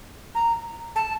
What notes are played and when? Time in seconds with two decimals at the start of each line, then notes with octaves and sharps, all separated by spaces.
0.35 A#5
0.96 A5